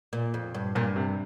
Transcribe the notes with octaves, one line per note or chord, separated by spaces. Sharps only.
A#2
F2
G2
G2 A#2
C3